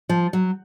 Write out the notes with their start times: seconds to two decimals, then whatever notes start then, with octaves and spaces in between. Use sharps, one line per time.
0.09 F3
0.33 F#3